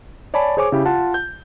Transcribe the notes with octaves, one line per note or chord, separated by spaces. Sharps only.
C#5 D5 G#5 A5 B5
G#4 C5 C#5 G#5 D6
C#3 E4 G4
F4 F#5 A5
G6